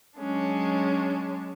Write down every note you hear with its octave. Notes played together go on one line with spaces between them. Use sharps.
F#3 G#3 C#4 D4